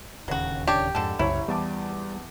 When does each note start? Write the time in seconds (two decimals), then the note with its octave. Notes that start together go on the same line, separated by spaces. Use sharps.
0.28 D1 D#2 C#3 F#3 F#4
0.67 D4 G4 C#5
0.95 F2 G#2 D3 A4
1.19 F#1 C2 F#2 E4 C#5
1.48 E2 G3 A5 D6